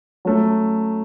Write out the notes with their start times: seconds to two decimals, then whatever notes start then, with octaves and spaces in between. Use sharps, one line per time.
0.25 F#3 A3 C#4